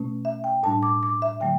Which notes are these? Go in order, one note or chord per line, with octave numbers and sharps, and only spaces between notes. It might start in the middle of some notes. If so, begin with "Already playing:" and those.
Already playing: B2 A3 C#4
E5
G5
A2 G3 D4 A5
D6
D6
E5
D3 F#3 A3 G5